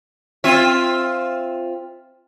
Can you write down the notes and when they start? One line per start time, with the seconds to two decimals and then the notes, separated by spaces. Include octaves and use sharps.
0.44 C4 F4 E5